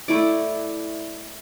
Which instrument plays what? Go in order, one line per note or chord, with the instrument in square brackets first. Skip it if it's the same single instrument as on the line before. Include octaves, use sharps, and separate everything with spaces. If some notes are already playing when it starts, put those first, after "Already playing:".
[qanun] A3 E4 D5